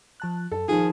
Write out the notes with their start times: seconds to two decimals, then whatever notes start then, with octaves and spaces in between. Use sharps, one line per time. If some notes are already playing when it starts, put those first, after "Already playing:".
0.20 F3 A5 F#6
0.52 F#2 A4
0.68 D#3 F3 F4 G#4